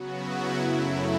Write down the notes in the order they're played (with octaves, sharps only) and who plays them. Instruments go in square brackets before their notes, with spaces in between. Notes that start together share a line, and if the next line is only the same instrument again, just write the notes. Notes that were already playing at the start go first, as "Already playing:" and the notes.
Already playing: [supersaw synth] C#3 F#3 B3 F#4
E4
F#2 C#3 F#3 A3